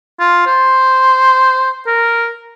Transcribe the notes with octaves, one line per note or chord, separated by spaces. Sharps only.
F4
C5
A#4